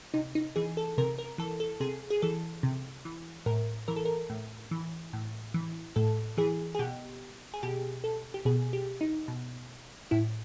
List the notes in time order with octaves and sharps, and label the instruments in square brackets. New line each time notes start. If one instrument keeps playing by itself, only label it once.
[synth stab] C3 D#4
D#4
E3 G#4
A4
C3 A#4
A#4
E3 A4
A4
C3 G#4
G#4
E3 A4
C3
E3
A2 A#4
E3 A#4
A4
A#4
A2
E3
A2
E3
A2 A4
E3 G#4
G#4
B2 G4
G#4
B2 G4
A4
G4
B2 G#4
G4
D#4
B2
A2 E4